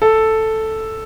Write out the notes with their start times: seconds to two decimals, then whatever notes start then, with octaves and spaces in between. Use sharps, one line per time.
0.02 A4